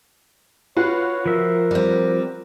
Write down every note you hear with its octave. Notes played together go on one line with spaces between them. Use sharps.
F4 F#4 B4 C#5
F3 A#4 E5
G3 C4